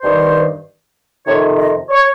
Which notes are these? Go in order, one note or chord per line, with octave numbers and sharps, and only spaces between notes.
G2 D#3 C5
F2 C3 D#3 C#5
D#5
C#5